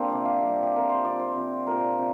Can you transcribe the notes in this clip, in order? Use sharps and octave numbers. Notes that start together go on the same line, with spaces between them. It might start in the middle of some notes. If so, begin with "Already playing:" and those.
Already playing: A#3 C4 D4 G4
C3 F3 D5
F5
C3 G3
G4
C3 F3 A#4
C5
C3 F3 D5
C5
C3 F3
A#2 F3 A#4
C3 F3